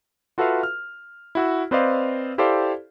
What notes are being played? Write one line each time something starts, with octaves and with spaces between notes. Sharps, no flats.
F4 F#4 A4 B4 E5 F5
F6
E4 F#4 E6
C4 B4 C5 D5 D#5 F5
E4 G4 A4 C5 D5 F5